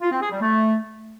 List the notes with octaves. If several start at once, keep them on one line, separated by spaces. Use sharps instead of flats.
F4
C4
G#4
G3
A3